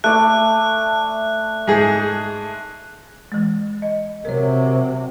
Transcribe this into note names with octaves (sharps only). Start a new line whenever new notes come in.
A3 D5 F#6
G#2 G#4
E3 G#3
D#5
C3 F#3 A#4 C#5